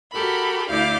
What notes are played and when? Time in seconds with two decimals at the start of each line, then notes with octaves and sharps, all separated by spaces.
0.11 F#4 G4 A4 A#4 B5
0.69 D2 E4 D5 F5 D6 G6